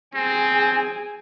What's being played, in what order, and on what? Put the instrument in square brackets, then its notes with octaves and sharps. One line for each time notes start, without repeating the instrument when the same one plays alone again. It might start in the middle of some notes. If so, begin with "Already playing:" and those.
[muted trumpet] C4 [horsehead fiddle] G#4 G#5